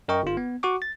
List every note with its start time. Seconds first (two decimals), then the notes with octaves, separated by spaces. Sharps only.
0.08 F#2 A#4 D#5 G5 C#6
0.23 G1 F4
0.37 B3
0.63 F#4 F#5 C#6 D6
0.82 A6